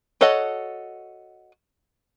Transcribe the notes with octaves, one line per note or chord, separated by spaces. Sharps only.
F#4 A4 C#5 D#5 F#5